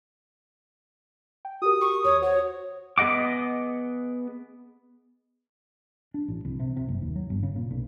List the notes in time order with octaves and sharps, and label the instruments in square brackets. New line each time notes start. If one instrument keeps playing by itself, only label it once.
[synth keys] G5
[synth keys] F#4 G4 A#4 [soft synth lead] D#6
[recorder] C#6
[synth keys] D#2 [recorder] C#5
[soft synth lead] F#4 [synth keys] C5 [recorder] C#5
[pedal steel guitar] B3 G#4 D#5 F#5 D6
[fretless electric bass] D4
A1
C2
C3
C3
F#1
D#2
F#3
G1
C#3
A#2
B1